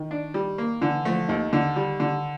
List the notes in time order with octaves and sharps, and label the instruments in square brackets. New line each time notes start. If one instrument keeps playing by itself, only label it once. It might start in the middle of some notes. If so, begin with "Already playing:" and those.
Already playing: [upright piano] D#3
[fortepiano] D4
G3
A#3
[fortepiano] D3 [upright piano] E3
[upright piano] F3 [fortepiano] A3
[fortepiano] D#2 [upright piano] D#3
[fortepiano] D3
G3
D3